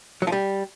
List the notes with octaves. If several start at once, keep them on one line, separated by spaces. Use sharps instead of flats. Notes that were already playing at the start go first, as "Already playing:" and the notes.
F#3
F3
G3